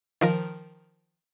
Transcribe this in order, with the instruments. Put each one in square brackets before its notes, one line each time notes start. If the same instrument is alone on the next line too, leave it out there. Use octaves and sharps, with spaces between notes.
[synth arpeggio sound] D#3 F3 A#4